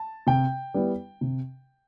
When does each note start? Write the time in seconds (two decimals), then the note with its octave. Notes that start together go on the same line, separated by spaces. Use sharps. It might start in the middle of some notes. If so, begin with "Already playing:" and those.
Already playing: A5
0.27 C3 G5
0.74 G3 B3 E4
1.21 C3